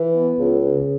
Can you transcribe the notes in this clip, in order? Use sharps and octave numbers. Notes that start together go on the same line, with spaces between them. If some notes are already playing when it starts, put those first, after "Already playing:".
Already playing: E3
B3
C#2
C#3